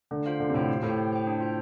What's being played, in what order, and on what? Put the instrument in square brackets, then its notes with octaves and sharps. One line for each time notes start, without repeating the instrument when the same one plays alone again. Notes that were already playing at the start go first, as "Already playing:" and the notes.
[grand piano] D3 [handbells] A3
[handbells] F4 C5 F5
[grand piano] D3 [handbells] A3
[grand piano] C3
[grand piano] A2 [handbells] F4 C5 F5
[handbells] G4
[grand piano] A2 [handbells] C5 G5
[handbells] G4
C5 G5
D4
F4 C5